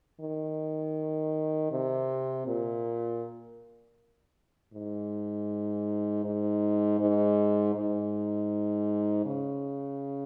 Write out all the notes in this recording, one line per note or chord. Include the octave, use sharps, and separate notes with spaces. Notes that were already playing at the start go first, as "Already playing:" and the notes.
D#3
C3
A#2
G#2
G#2
G#2
G#2
C#3